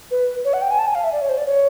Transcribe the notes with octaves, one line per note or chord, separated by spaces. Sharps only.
B4
C#5
F#5
G5
G#5
A5
G#5
F5
E5
D5
C#5
C5
D5
C#5